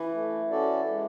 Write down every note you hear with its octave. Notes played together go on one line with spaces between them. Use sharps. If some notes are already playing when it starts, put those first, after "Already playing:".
Already playing: E3
A3
C#4 F#4 A4 D5
G#3